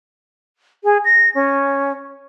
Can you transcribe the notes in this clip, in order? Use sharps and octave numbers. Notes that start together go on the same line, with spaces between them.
G#4
A#6
C#4